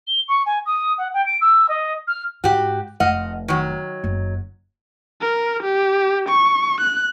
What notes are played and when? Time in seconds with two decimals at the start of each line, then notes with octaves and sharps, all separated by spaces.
0.07 G7
0.28 C#6
0.46 G#5
0.66 D#6
0.98 F#5
1.14 G5
1.26 D7
1.41 E6
1.68 D#5
2.07 F6
2.44 G#2 F#4 G4
3.00 F1 D#5 F5 F#5
3.48 D#3 F#3
4.04 F#1
5.22 A#4
5.63 G4
6.29 C#6
6.81 F#6